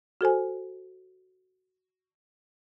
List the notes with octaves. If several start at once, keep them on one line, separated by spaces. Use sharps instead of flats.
F#4 A4 C5 G#5